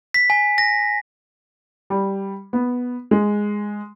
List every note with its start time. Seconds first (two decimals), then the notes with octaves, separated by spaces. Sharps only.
0.14 B6
0.30 G#5
0.58 A#6
1.90 G3
2.53 B3
3.11 G#3